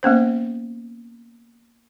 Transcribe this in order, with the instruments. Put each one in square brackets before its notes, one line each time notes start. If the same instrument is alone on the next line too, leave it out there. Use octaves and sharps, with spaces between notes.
[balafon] A#3 B3 C#4 C5